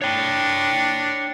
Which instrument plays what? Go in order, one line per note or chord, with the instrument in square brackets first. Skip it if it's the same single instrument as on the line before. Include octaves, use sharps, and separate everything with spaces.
[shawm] D4 [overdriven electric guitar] C#5 G5